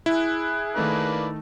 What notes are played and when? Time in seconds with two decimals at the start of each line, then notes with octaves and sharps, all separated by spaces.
0.06 E4 G#4 F#6
0.76 D#3 A3 A#3 D4 D#4 B4